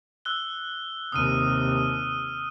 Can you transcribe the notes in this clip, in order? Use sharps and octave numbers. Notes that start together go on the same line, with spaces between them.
E6 F#6 G7
D#2 C3 D#6 F6 D#7